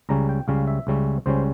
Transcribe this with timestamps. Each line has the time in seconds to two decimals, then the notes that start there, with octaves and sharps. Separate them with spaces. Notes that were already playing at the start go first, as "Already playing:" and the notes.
0.09 C#2 C#3 G3 C#4 A#5
0.29 G5
0.48 C#2 C#3 G3 C#4 F5
0.67 E5
0.87 C#2 C#3 G3 C#4
1.26 C#2 C#3 G3 C#4 C5